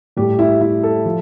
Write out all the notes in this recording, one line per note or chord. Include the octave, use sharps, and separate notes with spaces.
A2 G3 G4
E4
E4
A4
F3